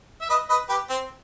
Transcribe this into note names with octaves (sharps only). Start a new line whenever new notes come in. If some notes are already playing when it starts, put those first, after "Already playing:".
E5
B4 D#5
B4 D#5
G4 B4
C4